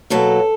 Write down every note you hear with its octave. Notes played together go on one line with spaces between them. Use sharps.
B2 F#3 A#3 A4